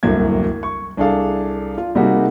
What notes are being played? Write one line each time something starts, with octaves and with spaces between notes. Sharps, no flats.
D1 C2 F#2 D3 A#3 G#6
C#6
C2 D4 G#4 A4 F5
F4
C3 G3 A#3 D#4 F#4 G#4